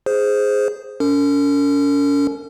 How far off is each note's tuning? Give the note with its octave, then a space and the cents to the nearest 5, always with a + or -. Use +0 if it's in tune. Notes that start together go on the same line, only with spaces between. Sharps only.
G#4 +0 C5 +0
C#4 +40 A#4 -45